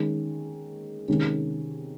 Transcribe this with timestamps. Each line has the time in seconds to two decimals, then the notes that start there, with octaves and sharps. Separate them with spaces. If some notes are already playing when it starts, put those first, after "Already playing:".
Already playing: D#3 G#3 C#4
1.08 C3 D#3 G#3 C#4